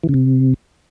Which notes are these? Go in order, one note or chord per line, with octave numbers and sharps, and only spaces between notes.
E3
C#3
C3